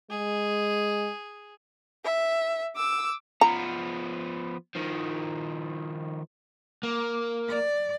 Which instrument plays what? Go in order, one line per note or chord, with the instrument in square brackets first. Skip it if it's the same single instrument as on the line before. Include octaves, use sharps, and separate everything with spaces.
[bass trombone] G#3 [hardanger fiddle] G#4
[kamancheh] E5
D6 E6
[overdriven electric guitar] F3 B3 [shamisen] A#5
[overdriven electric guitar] D#3 F3
A#3
[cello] D5